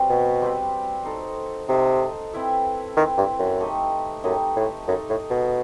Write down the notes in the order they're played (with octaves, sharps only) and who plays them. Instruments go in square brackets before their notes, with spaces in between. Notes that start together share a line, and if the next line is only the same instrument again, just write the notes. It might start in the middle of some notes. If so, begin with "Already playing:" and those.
Already playing: [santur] G3 C4 F#4 B4
[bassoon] B2
[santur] G3 C4 F#4 B4
D#4 A4 C5 D#5
[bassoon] C3 [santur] D#4 A4 C5 D#5
[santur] C4 E4 B4 E5
[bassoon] D#3 [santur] C4 E4 B4 E5
[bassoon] G2
F#2
[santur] A3 D#4 G4 D#5
[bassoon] F#2 [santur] A3 D#4 G4 D#5
[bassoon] A2
[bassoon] F#2 [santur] D#4 A4 D#5
[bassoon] A2
B2